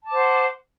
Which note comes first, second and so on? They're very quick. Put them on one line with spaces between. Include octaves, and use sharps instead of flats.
A5 D6 C5 F#5